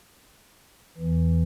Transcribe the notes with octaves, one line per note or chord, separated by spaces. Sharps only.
E2 E3